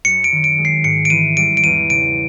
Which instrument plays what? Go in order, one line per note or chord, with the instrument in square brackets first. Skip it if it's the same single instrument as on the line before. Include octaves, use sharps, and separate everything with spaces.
[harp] F#2 [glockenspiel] C#7
[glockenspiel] D7
[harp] D#3
[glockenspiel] D7
[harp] G#3
[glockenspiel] C7
[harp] G#2 [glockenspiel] C#7
[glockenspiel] D7
[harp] E3 [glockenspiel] D#7
[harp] G3 [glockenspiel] D7
[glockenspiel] D7
[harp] E2 [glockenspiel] D#7
[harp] C#3 [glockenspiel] D7